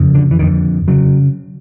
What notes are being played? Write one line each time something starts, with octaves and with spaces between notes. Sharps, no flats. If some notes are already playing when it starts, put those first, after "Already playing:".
Already playing: F2 C#3
D3
E3
F2 D3 D#3
C#3 F#3